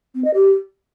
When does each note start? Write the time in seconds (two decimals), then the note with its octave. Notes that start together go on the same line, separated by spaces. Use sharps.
0.15 C4
0.25 D#5
0.34 G4